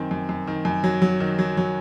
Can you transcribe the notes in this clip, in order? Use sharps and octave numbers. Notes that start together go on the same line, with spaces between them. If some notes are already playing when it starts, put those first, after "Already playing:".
Already playing: F#2 D#3 C4
F#2
F#2
D#3
F#2
F#3
F#3
D#3
F#3
F#3